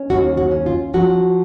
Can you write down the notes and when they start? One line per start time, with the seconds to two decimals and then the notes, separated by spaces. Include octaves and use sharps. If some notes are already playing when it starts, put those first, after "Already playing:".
Already playing: C#4
0.10 D#2 F#4
0.37 F#4
0.51 C#4
0.66 F4
0.94 F3 F#4